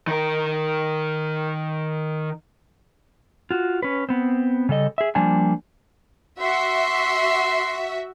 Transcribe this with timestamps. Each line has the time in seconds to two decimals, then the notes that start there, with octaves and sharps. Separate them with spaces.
0.07 D#3 A#4
3.51 F4 F#4
3.83 C#4 B4
4.09 B3 C4
4.69 C#3 G3 A4 D#5
4.98 G#4 E5
5.15 F3 G3 A#3 D4 G#5 A5
6.41 F#4 E5 C6